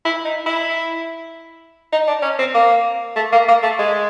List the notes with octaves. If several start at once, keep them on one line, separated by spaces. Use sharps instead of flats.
E4
D#4
E4
D#4
D4
C#4
C4
A#3
A3
A#3
A#3
A3
G#3